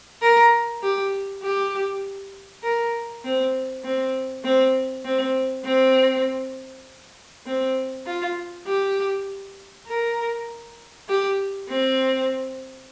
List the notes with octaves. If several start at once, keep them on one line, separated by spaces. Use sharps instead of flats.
A#4
G4
G4
A#4
C4
C4
C4
C4
C4
C4
F4
G4
A#4
G4
C4